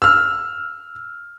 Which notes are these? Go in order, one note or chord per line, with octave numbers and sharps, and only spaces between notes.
E6 F6